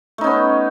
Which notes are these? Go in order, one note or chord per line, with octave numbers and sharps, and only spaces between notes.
A3 B3 C#4 D#4